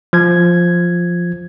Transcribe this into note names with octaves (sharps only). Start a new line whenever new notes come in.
F3 G#6